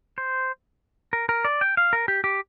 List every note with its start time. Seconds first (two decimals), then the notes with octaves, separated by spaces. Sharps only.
0.18 C5
1.13 A#4
1.29 A#4
1.45 D5
1.61 G5
1.77 F5
1.93 A#4
2.08 G4
2.24 G4